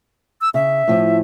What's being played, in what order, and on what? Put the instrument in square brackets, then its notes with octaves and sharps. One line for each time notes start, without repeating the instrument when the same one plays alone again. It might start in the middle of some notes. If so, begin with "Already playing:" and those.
[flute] E6
[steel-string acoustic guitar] C#3 [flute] E5
[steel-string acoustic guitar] A2 F3 C#4